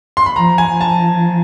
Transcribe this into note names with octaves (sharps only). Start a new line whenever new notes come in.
C6
B5
F3 A#5
G#5
F3
A5